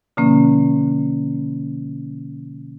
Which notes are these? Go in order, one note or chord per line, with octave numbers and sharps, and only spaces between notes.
B2 D3 F3 A#3 C#4